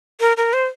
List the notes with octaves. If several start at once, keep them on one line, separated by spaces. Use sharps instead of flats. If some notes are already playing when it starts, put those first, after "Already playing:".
A#4
A#4
C5